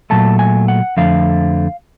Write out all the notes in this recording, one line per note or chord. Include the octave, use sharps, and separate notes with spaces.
A#2 F#3 A3 A5
G#5
F#5
F2 D3 F3 A3 F5